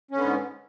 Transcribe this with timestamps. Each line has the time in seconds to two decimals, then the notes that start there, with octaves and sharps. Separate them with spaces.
0.11 C#4
0.15 D3
0.18 B3
0.21 G#2